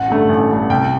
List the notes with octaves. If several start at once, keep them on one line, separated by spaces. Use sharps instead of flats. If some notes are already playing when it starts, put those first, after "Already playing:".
Already playing: A1 F#5
G2 D3 A3
A1
G2 D3 A3
C2 G5